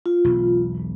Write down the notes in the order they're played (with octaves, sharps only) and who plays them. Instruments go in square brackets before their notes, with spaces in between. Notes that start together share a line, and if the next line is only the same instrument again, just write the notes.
[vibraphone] F4
[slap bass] E1 B1